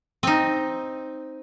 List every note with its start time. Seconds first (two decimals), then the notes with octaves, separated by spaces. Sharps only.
0.23 C4 D#4